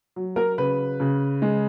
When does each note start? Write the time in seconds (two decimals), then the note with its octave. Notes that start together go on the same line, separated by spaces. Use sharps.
0.16 F#3
0.36 A#4
0.58 C#3 B4
1.00 C#3
1.42 G#3